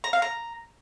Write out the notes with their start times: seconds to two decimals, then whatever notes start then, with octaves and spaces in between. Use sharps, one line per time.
0.04 A#5
0.13 F5
0.22 A#5